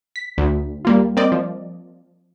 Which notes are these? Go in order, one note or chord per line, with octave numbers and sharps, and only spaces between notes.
B6
D2
G3 A#3 F4
C4 A#4 D5 D#5
F3